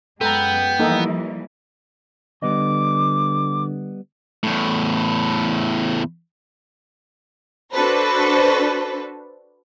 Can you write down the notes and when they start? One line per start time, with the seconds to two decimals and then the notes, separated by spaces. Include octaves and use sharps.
0.21 F#2 G#3 B3 A4 G5 A#5
0.79 E3 F3 G3 A#3 D#4 A4
2.42 D3 G3 B3 D#5 D6
4.43 E2 A2
7.72 D4 F#4 A4 B4 C5